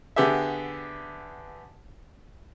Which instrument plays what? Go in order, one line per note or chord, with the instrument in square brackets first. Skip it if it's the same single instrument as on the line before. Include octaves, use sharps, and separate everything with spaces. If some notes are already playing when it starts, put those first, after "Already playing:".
[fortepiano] D3 B3 G4 G#4 E5